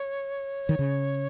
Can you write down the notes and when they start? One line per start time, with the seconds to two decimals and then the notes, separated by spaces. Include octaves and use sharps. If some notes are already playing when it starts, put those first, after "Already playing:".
Already playing: C#5
0.69 D#3
0.79 C#3